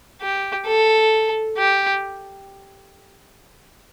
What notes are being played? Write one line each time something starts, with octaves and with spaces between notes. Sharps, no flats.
G4
A4
G4